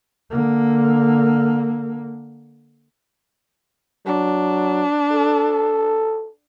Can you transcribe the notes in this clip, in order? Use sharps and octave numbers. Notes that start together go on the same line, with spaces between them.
D3 A#3
F#3 D4
A4